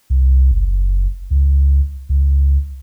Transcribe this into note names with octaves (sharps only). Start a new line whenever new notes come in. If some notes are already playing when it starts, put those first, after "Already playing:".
C2
F#1
C#2
C#2